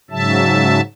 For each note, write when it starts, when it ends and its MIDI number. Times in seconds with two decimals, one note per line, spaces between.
0.11 0.81 44
0.11 0.81 49
0.11 0.81 54
0.11 0.81 76
0.11 0.81 81